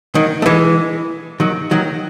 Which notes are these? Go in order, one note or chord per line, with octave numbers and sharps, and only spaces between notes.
D#3 F#3
A3
E3 G#3
D#3 F#3
D#3 F#3